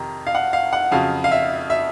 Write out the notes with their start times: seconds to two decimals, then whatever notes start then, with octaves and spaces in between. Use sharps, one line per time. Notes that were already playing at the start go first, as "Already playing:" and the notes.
Already playing: F2 C3 D#3 A#5
0.27 F5
0.35 F#5
0.53 F5
0.73 F#5
0.92 F2 C#3 F#3 F5
1.24 F5
1.31 E5
1.70 E5